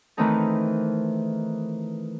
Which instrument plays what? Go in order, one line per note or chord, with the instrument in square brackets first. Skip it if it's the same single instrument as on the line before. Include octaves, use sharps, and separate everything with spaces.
[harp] D#3 E3 A3 C4 D#4 A4